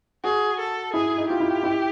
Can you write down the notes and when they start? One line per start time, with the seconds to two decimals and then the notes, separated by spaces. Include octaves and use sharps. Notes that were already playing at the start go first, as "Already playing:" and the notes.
0.24 F#4 G#4
0.59 A4
0.93 E4 G#4
1.17 D#4
1.28 F4 G4
1.40 E4
1.63 E4